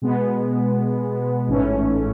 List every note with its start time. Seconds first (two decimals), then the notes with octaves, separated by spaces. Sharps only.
0.02 B2 G#3 B3
1.48 A1 G#2 E3 A3 C#4